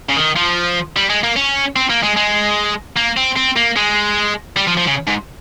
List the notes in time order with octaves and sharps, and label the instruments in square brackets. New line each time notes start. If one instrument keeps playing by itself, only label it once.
[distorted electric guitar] C#3
D#3
F3
G3
G#3
A#3
C#4
C4
A#3
G#3
G#3
A#3
C4
C4
A#3
G#3
G3
F3
F3
C#3
G#2